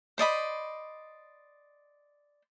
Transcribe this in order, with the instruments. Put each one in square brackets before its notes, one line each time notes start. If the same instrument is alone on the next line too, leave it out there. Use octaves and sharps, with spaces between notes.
[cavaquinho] C5 D5 D#5 B5